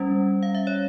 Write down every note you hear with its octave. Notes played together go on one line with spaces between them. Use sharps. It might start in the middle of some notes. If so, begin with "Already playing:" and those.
Already playing: G3 C#4
F5
E5
C#5